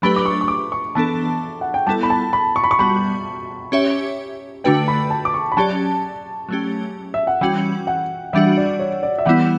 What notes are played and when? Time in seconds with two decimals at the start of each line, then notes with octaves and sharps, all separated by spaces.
0.02 F#3 A3 D4 G4 B4 B5
0.16 D6
0.26 C#6
0.41 C#6
0.48 D6
0.72 C#6
0.95 E3 B3 D4 A4 A5
1.61 F#5
1.74 G5
1.87 G3 B3 E4 A4 A5
2.03 B5
2.10 A5
2.33 B5
2.56 C#6
2.64 B5
2.71 C#6
2.79 G3 B3 F#4 B5
3.72 C#4 G4 C#5 E5
4.64 D3 A3 D4 F#4 B4 G5
4.88 B5
5.10 A5
5.25 D6
5.34 C#6
5.52 B5
5.57 F#3 C#4 G4 D5 A5
6.49 F#3 A3 C#4 G4
7.14 E5
7.27 F#5
7.41 E3 G3 C#4 F#4 G5
7.87 F#5
8.33 E3 G3 D4 F#4 E5
8.57 D5
8.79 C#5
9.03 D5
9.19 E5
9.25 E3 G3 B3 E4 F#5